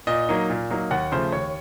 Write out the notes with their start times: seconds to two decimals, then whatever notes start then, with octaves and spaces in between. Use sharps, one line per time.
0.07 A#2 D#5
0.29 F#3 A#3 D#4
0.50 A#2
0.70 F#3 A#3 D#4
0.91 D#2 F#5
1.12 C#3 F3 A3 C5
1.32 D#2 C#5